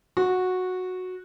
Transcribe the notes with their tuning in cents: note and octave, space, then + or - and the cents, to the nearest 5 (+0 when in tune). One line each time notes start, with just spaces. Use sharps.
F#4 -10